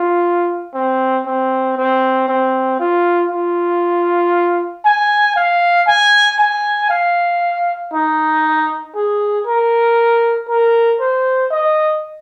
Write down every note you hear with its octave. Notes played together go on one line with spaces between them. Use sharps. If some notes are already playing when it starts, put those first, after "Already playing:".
Already playing: F4
C4
C4
C4
C4
F4
F4
G#5
F5
G#5
G#5
F5
D#4
G#4
A#4
A#4
C5
D#5